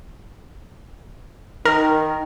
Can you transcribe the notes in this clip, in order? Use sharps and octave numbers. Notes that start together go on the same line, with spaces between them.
D#3 A#4